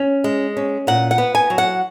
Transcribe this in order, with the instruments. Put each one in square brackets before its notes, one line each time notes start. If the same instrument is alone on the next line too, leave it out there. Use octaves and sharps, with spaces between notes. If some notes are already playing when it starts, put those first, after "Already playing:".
Already playing: [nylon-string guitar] C#4
G#3
C#4
A#2 F#5
F#5
B3
G#5
F#3
F#5